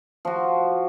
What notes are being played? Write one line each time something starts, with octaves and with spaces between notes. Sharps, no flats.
F3 F#4